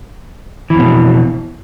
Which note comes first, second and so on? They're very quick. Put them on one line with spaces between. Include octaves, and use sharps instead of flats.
E3 F2 B2